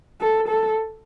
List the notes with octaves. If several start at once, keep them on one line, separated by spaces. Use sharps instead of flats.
A4
A4